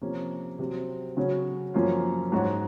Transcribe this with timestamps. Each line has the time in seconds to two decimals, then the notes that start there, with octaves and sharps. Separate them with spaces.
0.02 C3 F3 A#3 C#4
0.59 C3 F#3 C4
1.17 C#3 F#3 C#4 F#4
1.74 F#2 F3 A#3 C#4 F4
2.32 G#2 F#3 C#4 F#4